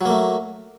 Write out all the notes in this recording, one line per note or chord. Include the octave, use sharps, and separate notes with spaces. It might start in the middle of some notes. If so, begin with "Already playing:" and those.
F#3 A3 A#3